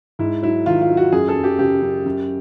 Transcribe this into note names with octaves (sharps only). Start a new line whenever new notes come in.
G#2 E4
F#3 E4
D#3 F4
F4
F#3
F#4
F#2 G#4
A4
F#2
G4
C#3 G4
F#2
F#2